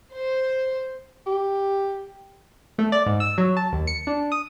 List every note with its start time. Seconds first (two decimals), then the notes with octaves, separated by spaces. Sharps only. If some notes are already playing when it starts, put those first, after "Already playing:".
0.15 C5
1.26 G4
2.78 A3
2.92 D5
3.06 G#2
3.20 E6
3.38 F#3
3.57 A5
3.72 D#2
3.87 C#7
4.07 D4
4.32 D#6